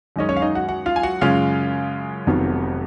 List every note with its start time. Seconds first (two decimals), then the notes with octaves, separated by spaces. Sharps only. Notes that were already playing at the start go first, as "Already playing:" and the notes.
0.16 F#2 D#3 G#3 C#4 D#5
0.29 C#4 C#5
0.37 F5
0.42 D#4 D#5
0.55 F#4 F#5
0.69 F#4 F#5
0.86 F4 F5
0.96 G#5
1.03 F#4 F#5
1.21 F#2 C#3 G#3 C#4 F4 F5
2.27 F1 F2 D#3 F#3 B3